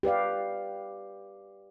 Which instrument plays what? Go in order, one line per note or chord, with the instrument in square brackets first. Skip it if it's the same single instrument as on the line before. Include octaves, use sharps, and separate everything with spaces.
[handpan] G4 B4 D5 F5